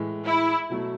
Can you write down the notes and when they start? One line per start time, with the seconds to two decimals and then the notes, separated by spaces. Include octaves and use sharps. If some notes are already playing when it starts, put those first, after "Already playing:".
Already playing: A2 E3 G#3
0.26 E4
0.70 B2 F#3 A3